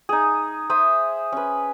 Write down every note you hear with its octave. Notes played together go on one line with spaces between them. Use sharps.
D#4 G#4
C5 E5 D#6
C#4 B4